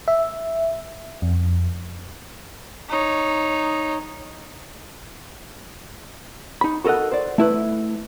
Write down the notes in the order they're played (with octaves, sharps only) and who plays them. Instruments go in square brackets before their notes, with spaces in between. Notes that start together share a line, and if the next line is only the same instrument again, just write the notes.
[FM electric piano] E5
F2
[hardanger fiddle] D#4 C#5
[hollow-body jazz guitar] D#4 B5
F#4 A4 A#4 D#5 F#5
C5 D5
A3 E4 B4